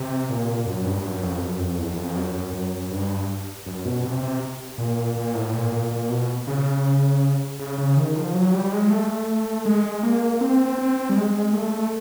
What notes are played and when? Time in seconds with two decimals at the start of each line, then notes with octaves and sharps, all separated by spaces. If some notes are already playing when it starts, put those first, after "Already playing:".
Already playing: C3
0.30 A#2
0.66 F#2
0.85 G2
1.04 F#2
1.23 F2
1.42 F#2
1.60 F2
1.79 E2
1.97 F2
2.16 F#2
2.54 F#2
2.91 G2
3.66 F#2
3.85 B2
4.04 C3
4.23 C3
4.78 A#2
5.16 A#2
5.35 A2
5.53 A#2
5.72 A#2
5.91 A#2
6.10 B2
6.47 C#3
7.60 C#3
7.78 C#3
7.97 D#3
8.16 F3
8.34 F#3
8.54 G3
8.72 G#3
8.90 A3
9.66 G#3
10.03 A#3
10.41 C4
10.79 C4
11.10 G3
11.16 G#3
11.53 A3